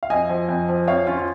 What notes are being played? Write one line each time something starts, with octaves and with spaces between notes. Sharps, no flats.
F5
F2 D#5 G#5
F3
F2
F3
F2 C#5 F5
F3 C#4 F4
F4